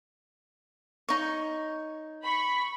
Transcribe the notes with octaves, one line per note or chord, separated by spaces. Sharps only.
D#4 C#5
B5 C#6